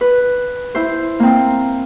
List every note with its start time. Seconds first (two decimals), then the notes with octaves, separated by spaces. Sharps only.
0.01 B4
0.75 E4 C5
1.20 A#3 C4